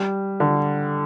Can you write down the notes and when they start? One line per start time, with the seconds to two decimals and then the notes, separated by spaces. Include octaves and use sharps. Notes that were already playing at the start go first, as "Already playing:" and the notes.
Already playing: G3
0.40 D3